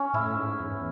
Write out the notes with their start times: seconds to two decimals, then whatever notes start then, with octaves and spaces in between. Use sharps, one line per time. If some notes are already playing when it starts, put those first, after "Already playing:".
Already playing: C#4
0.13 A2 E4
0.37 G#2
0.60 E2